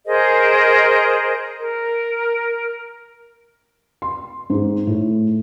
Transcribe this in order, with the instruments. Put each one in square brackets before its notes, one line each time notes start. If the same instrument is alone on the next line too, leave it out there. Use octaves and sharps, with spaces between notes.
[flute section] G#4 A#4 C5 D#5
A#4
[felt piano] C6
G#2
A2